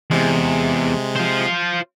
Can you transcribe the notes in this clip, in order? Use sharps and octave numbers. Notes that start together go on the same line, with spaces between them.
E2 C3 G#3
F4 C5